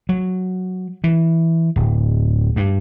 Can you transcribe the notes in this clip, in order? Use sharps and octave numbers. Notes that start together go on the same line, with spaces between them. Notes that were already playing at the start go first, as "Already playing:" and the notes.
F#3
E3
D1
G2